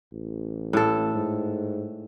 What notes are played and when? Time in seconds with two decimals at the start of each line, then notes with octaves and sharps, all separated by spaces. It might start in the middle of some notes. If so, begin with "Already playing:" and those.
0.13 A1
0.73 A2 A4
1.14 G#2